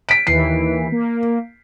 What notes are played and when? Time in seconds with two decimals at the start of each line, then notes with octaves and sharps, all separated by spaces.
0.09 B6 D7
0.27 D#2 E3 C7
0.92 A#3